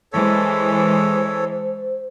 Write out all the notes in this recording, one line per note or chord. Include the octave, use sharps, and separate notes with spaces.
E3 G#3 A4 C5 C#5